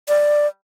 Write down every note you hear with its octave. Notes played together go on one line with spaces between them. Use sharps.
D5